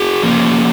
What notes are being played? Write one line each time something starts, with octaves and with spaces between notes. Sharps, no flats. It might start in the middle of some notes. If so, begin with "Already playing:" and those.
Already playing: F#4 G#4
F3 A#3 C#4